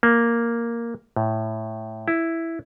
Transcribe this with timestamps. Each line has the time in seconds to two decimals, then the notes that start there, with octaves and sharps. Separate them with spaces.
0.03 A#3
1.16 A2
2.08 E4